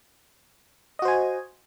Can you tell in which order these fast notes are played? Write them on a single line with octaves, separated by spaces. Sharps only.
D#5 F#4 C5 G#5